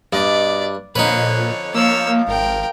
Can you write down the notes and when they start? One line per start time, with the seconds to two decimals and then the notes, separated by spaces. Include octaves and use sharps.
0.13 G2 B2 D5 D#5
0.96 F2 A#2 D3 D#4 B4 C#5
1.74 F3 A#3 C#5 E6
2.28 G#1 A#4 G5